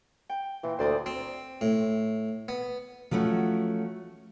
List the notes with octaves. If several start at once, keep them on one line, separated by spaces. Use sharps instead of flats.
G5
A#2 E3
D2 C5 D5 D#6
C4
A2
B3
F3 F#3 A3 C#4 F#4